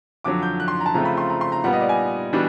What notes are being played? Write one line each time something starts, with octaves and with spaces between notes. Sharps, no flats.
F2 D3 F#3 D6
G6
F#6
C6
A#5
A5
C#3 F3 A3 C4 F4 A#5
B5
C6
A#5
C6
A#5
A#2 G3 B3 F#5
D#5
D5
G#5
E3 G3 B3 D4 F#4